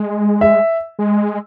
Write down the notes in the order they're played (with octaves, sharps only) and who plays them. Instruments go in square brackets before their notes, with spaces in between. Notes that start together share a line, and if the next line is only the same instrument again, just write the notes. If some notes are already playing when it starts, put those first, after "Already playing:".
Already playing: [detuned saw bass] G#3
[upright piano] E5
[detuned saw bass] G#3